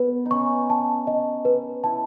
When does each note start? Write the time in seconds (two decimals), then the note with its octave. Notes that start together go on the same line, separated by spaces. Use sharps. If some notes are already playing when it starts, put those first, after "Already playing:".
Already playing: B3 B4
0.26 D#4
0.31 C#4 C#6
0.70 A5
1.07 D#5
1.45 B4
1.84 E4 A5